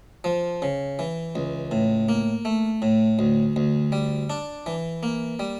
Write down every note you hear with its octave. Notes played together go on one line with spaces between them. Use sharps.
F3
C#3
E3
C#2
A2
A#3
A3
A2
D2
D2
G3
D4
E3
A#3
G3